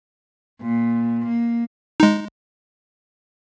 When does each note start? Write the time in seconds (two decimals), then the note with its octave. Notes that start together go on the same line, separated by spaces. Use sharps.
0.61 A#2
1.24 A#3
2.00 G#3 D#4